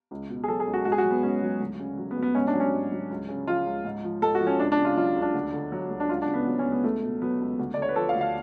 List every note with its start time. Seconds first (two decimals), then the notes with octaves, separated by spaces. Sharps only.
0.11 C#2
0.29 B2
0.44 G#4
0.48 F#3 A4
0.60 G#4
0.67 C#2
0.74 F#4
0.85 G#2 F#4
0.92 G#4
0.98 F#4
1.04 F#3
1.11 B3
1.23 G#2 C#4
1.42 F#3
1.60 D2
1.79 C#3
1.97 F#3
2.11 B3
2.17 D2
2.23 B3
2.35 G#2 C#4
2.47 D4
2.54 F#3
2.60 C#4
2.73 G#2
2.92 F#3
3.10 C#2
3.29 C#3
3.47 F3 F4
3.66 C#2
3.85 G#2
4.04 F3
4.22 G#2 A4
4.35 F#4
4.41 F3
4.47 C#4
4.60 C#2 D4
4.72 D4
4.78 C#3
4.85 F4
4.97 F#3 F4
5.16 C#2
5.22 D4
5.34 D2
5.53 D3
5.72 F#3
5.90 D2
6.00 D4
6.09 C#2 F4
6.22 D4
6.28 C#3
6.34 B3
6.46 F#3
6.59 C#4
6.65 C#2
6.72 B3
6.84 C#2 A3
7.03 B2
7.21 F#3 B3
7.40 C#2
7.59 D2
7.74 D5
7.77 D3 C#5
7.89 B4
7.96 F3 A4
8.09 F5
8.15 D2
8.21 F5